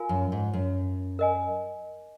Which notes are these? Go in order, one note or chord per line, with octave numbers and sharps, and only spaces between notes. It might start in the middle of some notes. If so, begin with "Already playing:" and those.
Already playing: F4 A#4 F5 G#5
F#2
G#2
F#2
A#4 D#5 G#5